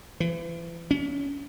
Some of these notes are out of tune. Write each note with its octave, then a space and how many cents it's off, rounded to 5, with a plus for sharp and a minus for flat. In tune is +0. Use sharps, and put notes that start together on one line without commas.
E3 +35
C#4 +35